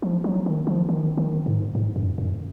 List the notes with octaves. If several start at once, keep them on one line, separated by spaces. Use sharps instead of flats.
F3
F#3
D#3
F3
D#3
D#3
G#2
G#2
F#2
F#2